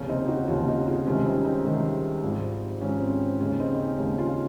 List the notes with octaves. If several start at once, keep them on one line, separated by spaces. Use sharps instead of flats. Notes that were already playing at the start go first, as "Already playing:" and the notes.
Already playing: F1 D#2 C#3 C#4
C4 D#4
D#4 F#4
F1 D#2 C#3 C#4 F4
F4
D#4 F#4
F4 G#4
C2 C3 D#3 G#3 C#4 F4
C4 D#4
C4 D#4
C2 C3 D#3 G#3
G#1 G#2 F3
G#1 G#2 F3 C#4
C4
D#2 C#3 G#3 C#4
C4 D#4
D#4
C#4
D#2 C#3 G#3
C#4 F4